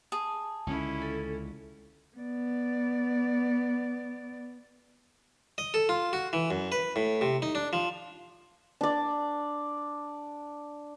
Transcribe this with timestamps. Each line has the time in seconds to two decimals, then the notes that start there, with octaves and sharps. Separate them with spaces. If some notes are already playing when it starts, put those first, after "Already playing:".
0.12 G#4 A5
0.67 C#2 D3 C#4 E4
1.02 A4
2.17 B3 D5
5.58 D#5
5.74 A4
5.89 F4
6.13 F#4
6.33 E3
6.50 F#2
6.72 B4
6.96 A2
7.21 C3
7.42 D#4
7.55 D4
7.73 F3
8.81 D4 D5